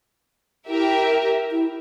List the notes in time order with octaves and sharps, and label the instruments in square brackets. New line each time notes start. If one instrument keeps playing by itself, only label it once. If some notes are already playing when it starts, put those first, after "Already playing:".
[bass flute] E4 [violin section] G4 A#4 E5
[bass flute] E4